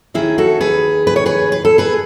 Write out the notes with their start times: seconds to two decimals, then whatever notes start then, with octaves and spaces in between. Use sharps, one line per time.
0.14 D#2 D#3 E4 G#4
0.38 F#4 A4
0.61 G#4 B4
1.07 B4
1.16 C#5
1.26 G#4 B4
1.52 B4
1.65 A4
1.78 G#4 B4